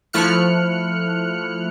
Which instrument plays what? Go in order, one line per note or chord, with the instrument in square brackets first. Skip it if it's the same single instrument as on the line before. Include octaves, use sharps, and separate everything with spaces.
[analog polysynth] F3 A3 E4 F6 F#6 C#7